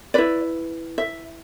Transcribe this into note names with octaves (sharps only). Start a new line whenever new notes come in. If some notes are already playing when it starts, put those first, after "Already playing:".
E4 B4 D5
E5